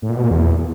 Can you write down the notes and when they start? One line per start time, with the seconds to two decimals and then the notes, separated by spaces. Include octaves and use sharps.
0.02 A2
0.09 A#2
0.16 B2
0.24 A#2
0.31 E2